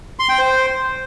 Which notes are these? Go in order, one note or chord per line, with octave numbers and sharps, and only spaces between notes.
C6
G5
C5